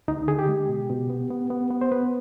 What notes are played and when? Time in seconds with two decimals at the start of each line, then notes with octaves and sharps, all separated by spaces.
0.08 D2 D#4
0.28 D3 G#4
0.39 G4
0.49 G#3
0.69 B2
0.89 B2
1.10 B3
1.31 B3
1.50 B3
1.71 B3
1.81 C5
1.92 B3 B4